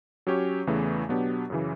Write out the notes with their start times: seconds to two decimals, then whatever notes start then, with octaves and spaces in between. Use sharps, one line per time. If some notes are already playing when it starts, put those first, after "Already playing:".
0.27 F#3 C#4 G4 C#5
0.67 E2 C#3 E3 A3
1.09 B2 F#3 B3 D4 G4
1.50 F#2 C#3 E3